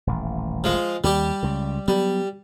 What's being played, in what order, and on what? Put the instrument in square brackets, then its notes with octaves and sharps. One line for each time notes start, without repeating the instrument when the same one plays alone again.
[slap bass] D#1 A1
[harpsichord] F3 G#3
[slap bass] D#2 [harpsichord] G3 G4
[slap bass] C#2 C#3
[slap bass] F#3 B3 [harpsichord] G3